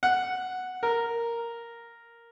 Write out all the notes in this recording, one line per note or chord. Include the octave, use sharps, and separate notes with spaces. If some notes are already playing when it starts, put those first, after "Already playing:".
F#5
A#4